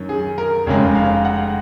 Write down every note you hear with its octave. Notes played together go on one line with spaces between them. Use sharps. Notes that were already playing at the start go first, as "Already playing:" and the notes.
Already playing: F#2 D#3 F#3 C#4
G#4
A#4
F1 F2 C#3 G#3 C#5
F5
F#5